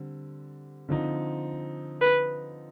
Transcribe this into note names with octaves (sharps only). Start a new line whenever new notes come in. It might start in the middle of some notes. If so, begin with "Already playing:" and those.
Already playing: D3 G3 C4
D3 F3 C4 D#4
B4